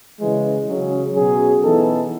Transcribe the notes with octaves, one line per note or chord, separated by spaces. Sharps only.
C#3 E3 G#3
C#3 F#3 C#4 G#4
B2 F#3 C#4 G#4
E3 B3 D#4 A4